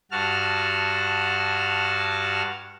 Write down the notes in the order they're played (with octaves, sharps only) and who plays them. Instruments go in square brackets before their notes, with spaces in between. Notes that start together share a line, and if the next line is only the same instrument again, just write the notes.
[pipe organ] G2 F#4 A5 F6